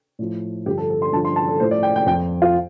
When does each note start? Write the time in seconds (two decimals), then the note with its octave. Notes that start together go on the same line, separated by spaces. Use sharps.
0.19 A2 F3
0.66 G2 D3 F3 G4
0.78 A4
0.90 A4
1.02 C6
1.12 G2 D3 F3 A5
1.25 C6
1.36 A5
1.48 A4
1.60 A2 F3 C5
1.71 D5
1.83 G5
1.96 G5
2.06 F2 G5
2.11 F3
2.42 F4